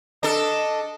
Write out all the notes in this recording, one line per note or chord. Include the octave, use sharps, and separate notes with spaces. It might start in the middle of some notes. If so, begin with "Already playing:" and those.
D4 A4 D#5